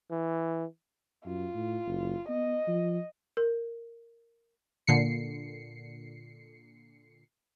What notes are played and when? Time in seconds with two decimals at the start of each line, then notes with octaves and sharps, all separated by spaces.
0.11 E3
1.25 F#2 F4
1.54 A2
1.85 F#1
2.29 B3 D#5
2.67 F3
3.37 A#4
4.87 A#2 D3 C7 C#7